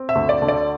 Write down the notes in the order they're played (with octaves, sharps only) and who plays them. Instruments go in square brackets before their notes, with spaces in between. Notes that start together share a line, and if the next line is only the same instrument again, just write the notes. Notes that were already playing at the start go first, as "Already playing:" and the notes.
Already playing: [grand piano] C4
E5
D2
D5
D3
D5